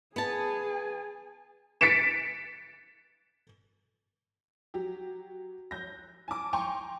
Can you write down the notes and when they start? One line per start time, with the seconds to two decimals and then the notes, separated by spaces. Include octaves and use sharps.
0.16 B3 G#4 G#5 A5
1.81 A6 B6 C#7 D7 E7
4.74 F#3 G4
5.71 G6 A#6
6.28 G#5 A5 D6
6.53 G5 G#5 A#5 C6 C#6